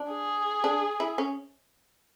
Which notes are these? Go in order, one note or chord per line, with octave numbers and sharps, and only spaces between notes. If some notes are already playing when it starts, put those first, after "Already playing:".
Already playing: D4
G#4
D4
E4
C#4